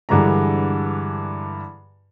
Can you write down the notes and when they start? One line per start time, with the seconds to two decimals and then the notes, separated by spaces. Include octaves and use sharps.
0.09 G2 D3 E3 G#3 A#5